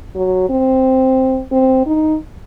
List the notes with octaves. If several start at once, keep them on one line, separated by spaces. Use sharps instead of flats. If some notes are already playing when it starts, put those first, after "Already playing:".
F#3
C4
C4
D#4